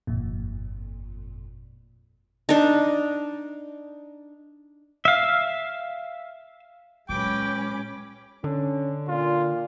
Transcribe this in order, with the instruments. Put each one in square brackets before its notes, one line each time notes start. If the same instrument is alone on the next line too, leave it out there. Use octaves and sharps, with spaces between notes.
[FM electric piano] G1 F2 A#2
[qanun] D4 D#4
[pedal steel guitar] E5 F5
[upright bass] A#2 F#3 [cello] G#3 C#4 [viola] B4 D6 [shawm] G5
[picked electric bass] D3 [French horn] C#4
[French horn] A#2 [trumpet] F4